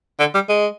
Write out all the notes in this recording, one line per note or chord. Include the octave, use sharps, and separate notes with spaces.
D3
G3
G#3